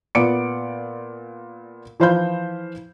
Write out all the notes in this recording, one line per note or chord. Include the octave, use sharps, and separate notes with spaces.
A#2 B3 D5 C#7 D7
E3 F3 C5 F5 B5 G6